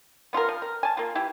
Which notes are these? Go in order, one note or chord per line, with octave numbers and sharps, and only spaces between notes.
B3 F4 A4 A#4
F3
A#4
G#5 A5
A#3 F4
E3 E4 G4